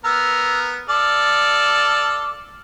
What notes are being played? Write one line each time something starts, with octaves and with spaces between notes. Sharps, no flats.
B3 A#4 E6
A4 D5 F5 D6